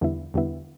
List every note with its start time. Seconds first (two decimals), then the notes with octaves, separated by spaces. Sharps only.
0.01 E2 D3 G3 B3 E4
0.34 E2 D3 G3 B3 E4